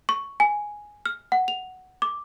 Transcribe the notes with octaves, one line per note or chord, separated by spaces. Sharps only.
C#6
G#5
F6
F#5
F7
D6